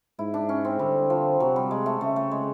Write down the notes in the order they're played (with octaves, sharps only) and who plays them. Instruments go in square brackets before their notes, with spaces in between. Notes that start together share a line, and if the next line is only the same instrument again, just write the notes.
[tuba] G#2 [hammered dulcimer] E4
[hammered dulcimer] D4
C#4
C4
[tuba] D3 [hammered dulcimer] G3
[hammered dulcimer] F3
[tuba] C3 [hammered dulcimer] F#3
[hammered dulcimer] G3
G#3
A3
[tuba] C#3 [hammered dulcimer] A3
[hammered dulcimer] A3
G#3